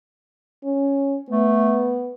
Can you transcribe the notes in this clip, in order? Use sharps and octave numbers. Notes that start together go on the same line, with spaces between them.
C#4
A3 B3